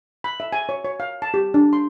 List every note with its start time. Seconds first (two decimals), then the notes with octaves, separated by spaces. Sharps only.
0.24 B5
0.40 E5
0.53 G#5
0.69 C#5
0.85 C#5
1.00 F5
1.22 A5
1.34 G4
1.54 D4
1.73 C6